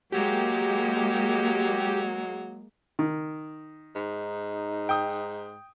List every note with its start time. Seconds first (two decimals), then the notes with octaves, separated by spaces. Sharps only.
0.12 F#3 G#3 A#3 G4
2.99 D#3
3.95 G#2 D#4
4.89 G5 D#6